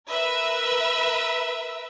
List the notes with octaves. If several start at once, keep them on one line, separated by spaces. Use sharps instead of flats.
A#4 B4 E5